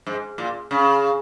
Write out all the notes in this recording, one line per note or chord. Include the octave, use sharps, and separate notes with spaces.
G#2
A#2
C#3